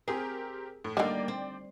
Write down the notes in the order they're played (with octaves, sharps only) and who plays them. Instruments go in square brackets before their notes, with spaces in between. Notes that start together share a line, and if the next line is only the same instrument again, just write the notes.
[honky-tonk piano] C4 G4 A#4 [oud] G#4
[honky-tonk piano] A2
[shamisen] D3 D#3 [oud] G3 A#3 [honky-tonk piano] D5 G5
[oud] C4